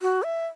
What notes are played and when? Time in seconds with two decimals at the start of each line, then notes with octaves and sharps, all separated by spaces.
0.02 F#4
0.23 E5